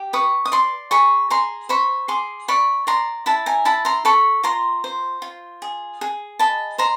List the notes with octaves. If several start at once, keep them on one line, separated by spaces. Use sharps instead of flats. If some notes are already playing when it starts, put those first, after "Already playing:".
Already playing: G4
B4 C#6 D#6
D#6
D5 C6 D6
G#4 B5 C#6
G#4 A#5 C6
C5 B5 C#6
G#4 C6 D6
D5 B5 C#6
D5 A#5 C6
E4 A5 B5
G#5 A#5
E4 A5 B5
A#5 C6
A4 B5 C#6
F4 A#5 C6
C5
F4
G#4
G#4
D#5 A5 B5
C5 A#5 C6